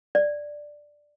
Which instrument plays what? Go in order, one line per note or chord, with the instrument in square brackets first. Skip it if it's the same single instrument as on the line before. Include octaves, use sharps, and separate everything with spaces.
[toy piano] D5